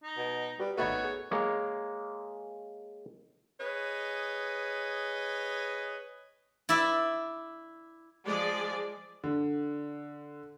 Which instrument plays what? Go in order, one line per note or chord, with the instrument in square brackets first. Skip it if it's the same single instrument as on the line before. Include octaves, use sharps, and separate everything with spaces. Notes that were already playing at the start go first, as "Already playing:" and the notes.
[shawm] D#4
[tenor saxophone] B2
[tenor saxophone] G3 [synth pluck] F#4 B4 D5
[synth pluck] G#1 B5 G#6 [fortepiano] A3 B3 D#4 [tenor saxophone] F#4 [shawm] C#5
[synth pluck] G#4
[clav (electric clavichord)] G#3 A#3 C#5
[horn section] G#4 B4 C#5 D#5
[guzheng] E4 D5 E5
[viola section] F3 G#3 G#4 D5
[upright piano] D3